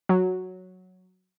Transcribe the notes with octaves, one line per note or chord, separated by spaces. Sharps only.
F#3